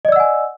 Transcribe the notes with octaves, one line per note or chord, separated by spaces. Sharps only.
D5 D#5 F#5 G#5 E6